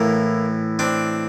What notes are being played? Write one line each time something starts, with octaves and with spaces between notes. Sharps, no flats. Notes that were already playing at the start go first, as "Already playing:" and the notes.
Already playing: A2 E3 A#3
C4 D4